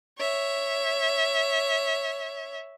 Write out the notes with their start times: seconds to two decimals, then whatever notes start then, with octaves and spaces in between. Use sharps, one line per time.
0.18 C#5 E5